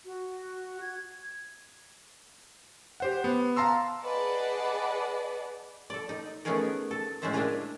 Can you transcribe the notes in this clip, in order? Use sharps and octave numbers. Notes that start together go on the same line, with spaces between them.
F#4
G#6
G4 C5 F#5
B3
F5 A5 A#5 C6 E6
G#4 B4 D5 D#5 F#5 A5
A4 D5
D#4
A3 B3 C#4 D#4 G#4 A#4
A4
A2 G#3 A3 C#4 C5 E5
A#3 D4 D#5 E5 G#5 A#5